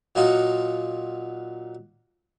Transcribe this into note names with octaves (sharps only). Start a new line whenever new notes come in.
A#2 F#3 D#4 F4 F#4